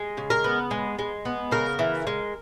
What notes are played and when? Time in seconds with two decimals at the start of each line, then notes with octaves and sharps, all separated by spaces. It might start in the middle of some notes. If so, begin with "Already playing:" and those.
Already playing: G#3
0.17 C#3
0.30 A#4
0.44 B3
0.71 G#3
0.99 G#3
1.25 B3
1.51 C#3 A#4
1.79 E3
2.07 G#3